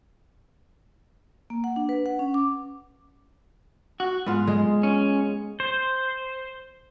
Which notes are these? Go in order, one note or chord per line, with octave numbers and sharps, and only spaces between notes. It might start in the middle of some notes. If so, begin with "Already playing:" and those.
A#3
F#5
D4
B4
F#5
C#4
D6
F#4
G#2 B3 F4
G#3
C#4
C5